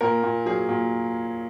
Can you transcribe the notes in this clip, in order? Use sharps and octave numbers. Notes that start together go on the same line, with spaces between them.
A#2 A#4
A#2
F#3 G#4
A#2